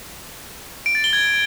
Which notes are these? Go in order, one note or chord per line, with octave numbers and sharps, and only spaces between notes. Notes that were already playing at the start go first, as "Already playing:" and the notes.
D7
A6
G7
G#6